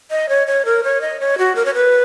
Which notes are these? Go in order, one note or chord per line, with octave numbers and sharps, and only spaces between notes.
D#5
C#5
C#5
A#4
C#5
D#5
C#5
F#4
A#4
C#5
B4